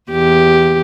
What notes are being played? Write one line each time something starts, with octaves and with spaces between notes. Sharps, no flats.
E2 G4